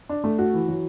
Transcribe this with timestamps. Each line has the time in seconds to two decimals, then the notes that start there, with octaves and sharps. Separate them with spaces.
0.09 D4
0.24 A3
0.39 F#4
0.54 E3
0.68 F#3